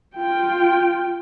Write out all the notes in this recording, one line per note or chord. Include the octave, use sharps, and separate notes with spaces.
F4 G5